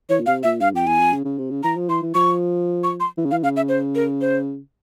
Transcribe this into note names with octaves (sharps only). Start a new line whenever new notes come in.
E3 C#5
A#2
C3 F5
A#2 E5
G2 F5
F2 G5
E2 G#5
F2
C#3
C#3
C3
C#3
E3 A#5
F3
E3 C6
E3
F3 C#6
C#6
C6
E3
C#3
E3 F5
C#3 F5
E5
C5
A#4
C5